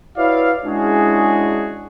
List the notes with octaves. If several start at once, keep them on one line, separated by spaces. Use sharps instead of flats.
E4 F#4 B4 C#5 D5 F5
G#3 C#4 D4 E4 F#4 G#4